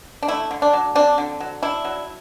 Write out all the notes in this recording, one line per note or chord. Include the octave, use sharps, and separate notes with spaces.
D4
A3 E4
D3
D4
F#3
C4 D4
D3
F#3
D4 E4
F#3